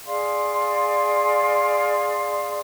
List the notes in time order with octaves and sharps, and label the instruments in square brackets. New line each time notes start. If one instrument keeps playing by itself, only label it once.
[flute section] G#4 D5 F5 C6